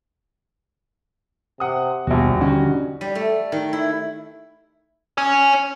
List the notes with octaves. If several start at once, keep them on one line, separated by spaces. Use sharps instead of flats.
C3 F#5 D#6
A#1 D#2 B2 G3 F#4
D3 C#4 D#4 F#4
G3
A3
D#3
E4
C#5 G#5